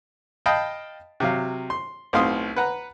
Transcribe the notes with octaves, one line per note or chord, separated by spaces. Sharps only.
D#5 F5 G5 A5 B5
C3 F#3 F5
C6
B1 A2 C4 F5 C6 D#6
B4 F#5 A#5